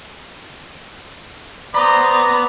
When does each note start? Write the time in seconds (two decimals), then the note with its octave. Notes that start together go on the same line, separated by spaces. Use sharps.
1.75 B3 C5 D5 A#5 B5 D#6